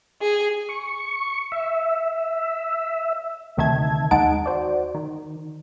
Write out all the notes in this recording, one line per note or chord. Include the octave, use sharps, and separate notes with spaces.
G#4
C#6
E5
D2 C3 D#3 E5 A5 G#6
D#2 G#3 D#4 F#5 A5 D7
F#4 C5 D5
D#3